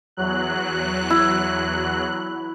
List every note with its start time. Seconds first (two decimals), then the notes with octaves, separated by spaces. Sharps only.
0.17 E2 F#3 F#6
1.10 E4